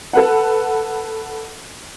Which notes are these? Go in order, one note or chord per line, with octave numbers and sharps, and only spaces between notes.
A4 B4 F#5